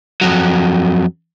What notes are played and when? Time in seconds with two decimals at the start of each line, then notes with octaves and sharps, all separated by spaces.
0.21 F2 F#3